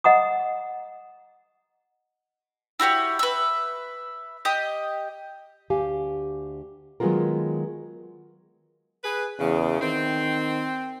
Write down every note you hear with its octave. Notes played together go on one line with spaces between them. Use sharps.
D#5 F#5 A#5 D#6
E4 F#4 G4 C#5
B4 E5
G4 D#5 D#6
D2 G4 F5 G#5
D#3 F#3 G#3 B3 F4 A#4
G#4 B4
E2 C#3
D#3 C4